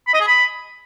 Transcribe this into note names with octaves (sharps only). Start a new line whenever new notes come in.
B5
D#5
G#4
B5